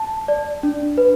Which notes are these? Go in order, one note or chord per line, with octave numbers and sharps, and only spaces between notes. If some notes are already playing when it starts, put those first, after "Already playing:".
Already playing: A5
D5
D4
B4